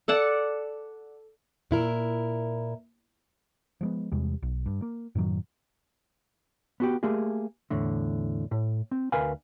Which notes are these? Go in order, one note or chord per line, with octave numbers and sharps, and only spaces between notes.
A4 D5 F#5 A5
A#2 E4 A#4
F3 G#3 B3
E2 C3 G3 G#3
B1
G2
A#3
F#2 A2 D#3 F#3
B3 F#4 G4
A3 A#3 G4 G#4
E2 A2 D3
A2
C4
D2 A#4 B4 F5 G#5